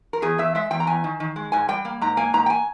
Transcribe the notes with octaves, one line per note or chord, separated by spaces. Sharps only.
A#4
E2 G#4
E2 E5
G#3 E5
E2 G5
A#5
E2 G#5
D#3
D#3
G#3
G#2 G#5
G3 G5
A#3
G#2 A#5
A#3 G#5
G#2 A#5
G5
G#5